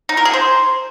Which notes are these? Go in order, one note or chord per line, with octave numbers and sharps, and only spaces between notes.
D#4
A#4
G#4
C5